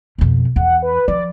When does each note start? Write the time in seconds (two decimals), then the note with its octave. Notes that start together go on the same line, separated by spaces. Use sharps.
0.18 F2 B2
0.56 E2 F#5
0.82 B4
1.08 F3 D5